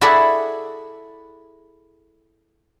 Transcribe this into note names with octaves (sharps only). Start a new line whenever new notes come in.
E4 F#4 G#4 A4 D5 E5